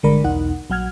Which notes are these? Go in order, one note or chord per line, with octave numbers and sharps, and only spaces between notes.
G1 D3 G#3 A#4 D5 B5
B1 E2 D#4 F#5
A#1 F#3 F#5 F6 G#6